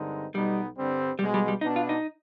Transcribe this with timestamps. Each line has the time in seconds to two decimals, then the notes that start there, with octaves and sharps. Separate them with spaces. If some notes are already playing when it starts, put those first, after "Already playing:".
Already playing: G2 D3 G#3 C4 D#4
0.34 B1 B2 G3 B3 D#4
0.77 G2 D3 G3 C4
1.19 B1 B2 G3 G#3
1.34 G3
1.48 G3
1.61 B2 B3 D4 D#4
1.76 F4
1.89 D#4